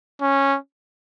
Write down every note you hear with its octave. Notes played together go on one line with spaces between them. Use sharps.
C#4